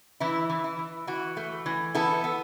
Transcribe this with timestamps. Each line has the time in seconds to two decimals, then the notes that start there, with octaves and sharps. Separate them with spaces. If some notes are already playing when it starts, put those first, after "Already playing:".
0.20 E3 E4
0.50 E3
0.64 E4
0.79 E3
1.07 E3 F#4
1.37 A3
1.66 E3
1.95 B3 E4 A4
2.24 B3